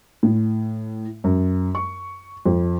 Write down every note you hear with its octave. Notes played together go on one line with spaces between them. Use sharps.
A2
F#2
C#6
F2